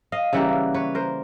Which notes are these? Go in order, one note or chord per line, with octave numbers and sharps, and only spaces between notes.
D#5 F5
C#3 E3 G3 A#3 E5 F#5
B4 C#5
A#4 C5